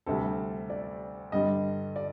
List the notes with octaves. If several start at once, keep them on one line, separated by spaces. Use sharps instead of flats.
D2 C3 G3 A4
D5
G2 D3 G3 D#5
D5